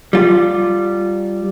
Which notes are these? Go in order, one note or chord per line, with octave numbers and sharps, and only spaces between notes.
G3 F4